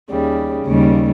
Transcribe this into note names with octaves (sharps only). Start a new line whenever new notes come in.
D#2 C#3 G3
D#2 C#3 G3